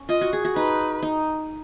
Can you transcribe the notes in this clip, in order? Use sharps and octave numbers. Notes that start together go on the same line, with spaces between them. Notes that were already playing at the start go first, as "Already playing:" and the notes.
Already playing: C#4
F4 D#5
F#4
G#4
F#4
D#4 B4
D#4